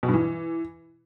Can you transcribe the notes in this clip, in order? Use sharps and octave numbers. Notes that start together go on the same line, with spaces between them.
B2
G2
E3